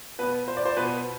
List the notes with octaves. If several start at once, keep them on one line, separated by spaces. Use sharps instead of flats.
B2 B3 B4
C5
D5
C5
B2 B3 B4